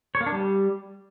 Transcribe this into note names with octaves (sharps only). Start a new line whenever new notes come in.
C#5
A#3
D4
G3